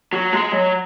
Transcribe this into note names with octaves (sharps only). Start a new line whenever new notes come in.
F#3
G#3
F#3